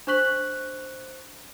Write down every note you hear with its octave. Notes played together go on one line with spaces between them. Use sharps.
D4 C5 C#6 F#6 B6 F#7